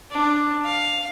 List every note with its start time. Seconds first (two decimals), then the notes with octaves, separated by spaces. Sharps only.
0.11 D4
0.65 F5